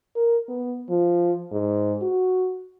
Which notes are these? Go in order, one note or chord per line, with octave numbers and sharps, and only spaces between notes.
A#4
B3
F3
G#2
F#4